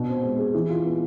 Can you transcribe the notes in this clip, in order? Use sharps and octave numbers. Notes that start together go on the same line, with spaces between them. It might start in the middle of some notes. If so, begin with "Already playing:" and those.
Already playing: B2 D4
C4
G#3
G#4
E3
F4
B3